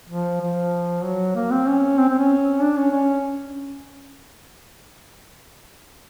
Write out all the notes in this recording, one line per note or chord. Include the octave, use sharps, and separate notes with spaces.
F3
F3
F#3
A#3
C4
C#4
C4
C4
C#4
D4
C#4
C#4